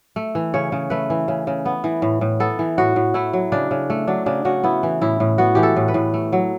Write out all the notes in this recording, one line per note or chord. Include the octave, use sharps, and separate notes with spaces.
A3
E3
C#3 C#5
C#3
A3 B4
E3
C#3
C#3
B3
E3
A2
A2
B3 A4
E3
A2 F#4
A2
A3 E4
F#3
C#3 D4
C#3
A3
F#3 D4
C#3 D4
C#3 F#4
B3 E4
E3
A2 E4
A2
B3 F#4
E3 G4
A4
A2
B4
A2
A3
F#3